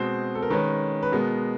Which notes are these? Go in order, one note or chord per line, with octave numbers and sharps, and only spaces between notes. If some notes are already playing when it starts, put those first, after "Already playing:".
Already playing: B2 G#3 C4 C5
A4
A#4
D#3 G#3 C#4 B4
B4
B2 G#3 B3 A#4